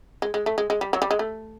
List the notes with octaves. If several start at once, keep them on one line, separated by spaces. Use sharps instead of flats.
G#3
G#3
A3
G#3
G#3
G3
F#3
G3
G#3
A3